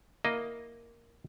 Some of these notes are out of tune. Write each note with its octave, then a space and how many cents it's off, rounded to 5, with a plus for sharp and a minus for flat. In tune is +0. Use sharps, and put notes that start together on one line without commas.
A#3 +0 E4 -5 D#5 +0